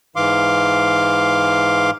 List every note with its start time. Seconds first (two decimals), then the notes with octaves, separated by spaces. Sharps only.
0.16 G#2 E3 F5 C6 D6